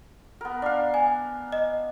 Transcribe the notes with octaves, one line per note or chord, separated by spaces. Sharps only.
B3 A#4
D4 F5
G#5
D#5